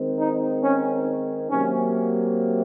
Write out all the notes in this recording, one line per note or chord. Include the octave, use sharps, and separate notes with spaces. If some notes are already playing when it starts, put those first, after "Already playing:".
Already playing: D#3 G#3 C4
D#4
C#4
C3 F#3 A#3 C#4